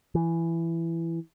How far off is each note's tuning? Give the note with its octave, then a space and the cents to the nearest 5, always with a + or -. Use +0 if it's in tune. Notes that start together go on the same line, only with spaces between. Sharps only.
E3 +15